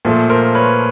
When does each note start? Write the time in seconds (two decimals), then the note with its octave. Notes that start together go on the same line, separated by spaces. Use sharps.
0.05 A#2 F3 A3
0.30 A#4 C5
0.55 B4 C#5